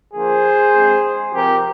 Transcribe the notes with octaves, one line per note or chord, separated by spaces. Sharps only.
D3 F3 A#3 G#4 C5
D3 G#3 C4
C3 F3 C4 G4 A#4